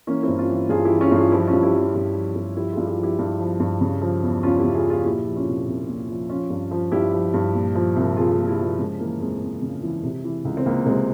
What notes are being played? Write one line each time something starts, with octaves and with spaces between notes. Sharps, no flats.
E3 A#3 C#4
G2 C4 E4
C#4 F4
E3
G2 F4 G#4
E4 G4
E3
C#4 F4
G2 F4 G#4
F3 E4 G4
C#4 F4
G2
E4 G4
F3 C#4 F4
G2
F3
G2
F3 E4 G4
F4 G#4
G2
E4 G4
F3
E4 G4
G2
F3
G2
C#3
F3
E2
E2 C#4 F4
E4 G4
C#3
F4 G#4
F3
F4 G#4
A#2 E4 G4
F3
C#4 F4
C2
C2
A#2
F3
F3 C#4 F4
G2
F3
G2 E4 G4
F3
G2
A#2
F3
C2
C2 F4 G#4
F4 G#4
A#2
E4 G4
F3 A#3
C#3 G#3
E3 A#3
F2 G#3
F2
C#3
E3
C3
E3
C#2
C4
C#2 A#3
C3 G#3 C4